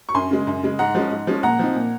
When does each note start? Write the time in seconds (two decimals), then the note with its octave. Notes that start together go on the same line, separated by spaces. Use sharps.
0.09 C#6
0.14 F#2 G#5 C6
0.31 C#3 G#3
0.47 F#2
0.63 C#3 G#3
0.79 G#2 F#5 A#5
0.95 F3 G#3 C#4
1.11 G#2
1.27 F3 G#3 C#4
1.43 A#2 F#5 A#5
1.59 F3 C4 D#4
1.75 A#2